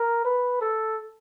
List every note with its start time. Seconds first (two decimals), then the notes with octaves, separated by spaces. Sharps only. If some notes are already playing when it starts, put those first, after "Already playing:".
Already playing: A#4
0.24 B4
0.61 A4